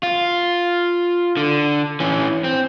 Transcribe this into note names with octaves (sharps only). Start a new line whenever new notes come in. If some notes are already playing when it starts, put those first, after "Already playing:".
F4
D3
E3 C#4
C4